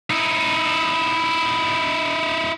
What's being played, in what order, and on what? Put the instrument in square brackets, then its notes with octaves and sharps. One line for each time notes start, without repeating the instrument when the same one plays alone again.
[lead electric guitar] D#4 E4